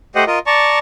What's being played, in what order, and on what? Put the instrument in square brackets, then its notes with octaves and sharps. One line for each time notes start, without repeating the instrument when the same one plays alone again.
[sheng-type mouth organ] A3 G4 C5 D#5 F#5
F4 A#4 D#5
D5 A5 A#5 C#6